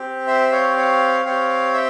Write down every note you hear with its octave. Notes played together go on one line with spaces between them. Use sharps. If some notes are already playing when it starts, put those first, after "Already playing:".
Already playing: C4 G4
C5 E5
C#5 F5
C#5 F5
C4 G4 C#5 F5
E5 G5